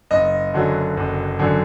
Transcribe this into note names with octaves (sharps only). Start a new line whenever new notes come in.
F#1 D#5
F#2 D3 F#3
F#1
F#2 D3 F#3